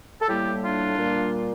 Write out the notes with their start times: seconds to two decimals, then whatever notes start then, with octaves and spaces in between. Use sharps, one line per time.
0.21 A4
0.28 A2 G3 A#3 E4 G4
0.63 D4 F4
0.97 A#2 G3 A#3